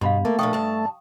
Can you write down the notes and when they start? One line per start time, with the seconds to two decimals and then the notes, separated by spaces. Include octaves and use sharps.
0.01 G2 B2 F5 B5 C6
0.25 A3 A#3
0.39 A#2 F3 D4 G5 C#6 D#6
0.53 G2 A5